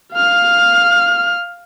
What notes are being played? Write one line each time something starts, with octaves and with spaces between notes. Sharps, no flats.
F5 F6